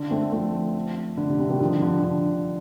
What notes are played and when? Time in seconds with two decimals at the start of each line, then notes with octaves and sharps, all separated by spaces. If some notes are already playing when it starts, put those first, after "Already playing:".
Already playing: D3
0.10 A3 C4
0.32 F3 A3
1.17 D3
1.29 C3
1.39 C3
1.50 D#3 G3
1.60 D3 F3
1.82 D3
2.04 D3